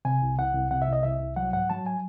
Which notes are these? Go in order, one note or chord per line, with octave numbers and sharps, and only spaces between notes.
C3 G#5
C2
C2 F#5
C2
C3 F#5
E5
C2 D#5
C2 E5
C2
F#3 F#5
G#2 F#5
F#3 A5
G#5